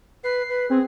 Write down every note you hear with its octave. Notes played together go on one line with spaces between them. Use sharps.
B4 C7
B4
C4 G#4